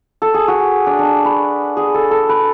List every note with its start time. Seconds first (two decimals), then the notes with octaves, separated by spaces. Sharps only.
0.22 A4
0.34 G#4
0.48 F#4
0.87 D4
0.99 D4
1.25 B4
1.77 G#4
1.94 A4
2.11 A4
2.29 B4